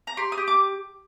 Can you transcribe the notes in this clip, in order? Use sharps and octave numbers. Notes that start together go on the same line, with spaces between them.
A#5
G4 C6
D#6
G4
D6